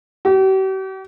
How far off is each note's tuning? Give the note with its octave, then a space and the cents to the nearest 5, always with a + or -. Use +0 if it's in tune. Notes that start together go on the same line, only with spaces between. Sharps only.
G4 -45